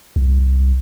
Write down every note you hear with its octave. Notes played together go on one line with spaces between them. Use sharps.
C2